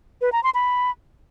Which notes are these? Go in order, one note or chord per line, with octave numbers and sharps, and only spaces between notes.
B4
A#5
C6
B5